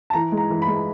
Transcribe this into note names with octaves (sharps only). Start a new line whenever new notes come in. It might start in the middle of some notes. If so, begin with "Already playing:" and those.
A5
E3 A#5
G#3
A#5
E3
B5
G#3